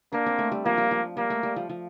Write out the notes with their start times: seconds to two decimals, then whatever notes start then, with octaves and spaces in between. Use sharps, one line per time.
0.13 A#3 D4
0.26 C4
0.39 A3
0.52 G3
0.65 F3 A#3
0.78 G3
0.91 F3
1.17 G3 A#3
1.30 A3
1.43 G3
1.56 F3
1.69 F3